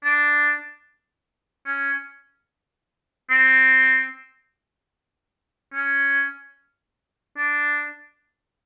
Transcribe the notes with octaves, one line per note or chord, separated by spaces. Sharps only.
D4
C#4
C4
C#4
D4